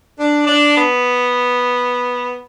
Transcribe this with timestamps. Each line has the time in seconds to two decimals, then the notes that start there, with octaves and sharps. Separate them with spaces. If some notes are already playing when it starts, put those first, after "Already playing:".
0.18 D4
0.47 D4
0.77 B3